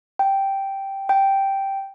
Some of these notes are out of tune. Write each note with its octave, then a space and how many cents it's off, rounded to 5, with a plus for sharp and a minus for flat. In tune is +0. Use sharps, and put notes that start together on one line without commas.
G5 -5
G5 -5